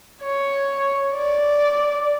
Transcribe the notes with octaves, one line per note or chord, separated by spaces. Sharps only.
C#5
D5